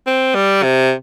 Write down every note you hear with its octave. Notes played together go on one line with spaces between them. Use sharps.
C4
G3
C3